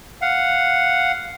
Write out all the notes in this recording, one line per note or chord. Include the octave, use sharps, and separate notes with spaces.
F5 F#5